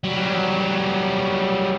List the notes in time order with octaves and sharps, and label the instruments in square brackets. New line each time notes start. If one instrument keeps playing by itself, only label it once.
[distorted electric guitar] F#3 G3